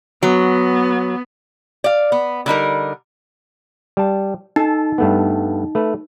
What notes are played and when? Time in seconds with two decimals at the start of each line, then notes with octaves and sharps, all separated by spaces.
0.23 F#3 B3
1.84 D5 F5
2.12 B3
2.46 D3 G3 D#4 A#4
3.97 G3 A5
4.56 D#4 A4 G#5 A5
4.98 G2 A3 B3
5.75 A3 B4